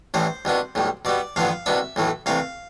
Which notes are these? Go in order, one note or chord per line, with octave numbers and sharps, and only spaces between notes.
A1 A2 E3 G3 C5
C2 B2 B3 D4
B1 A2 G3
B2 G3 B3 D5
A1 G2 D3 F3 B3 F5
C2 B2 B3 D4 E5
B1 A2 E3 A3
C2 C3 E3 A3 F5